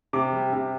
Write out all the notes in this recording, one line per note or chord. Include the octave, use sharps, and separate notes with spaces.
C3 D6
G3
C3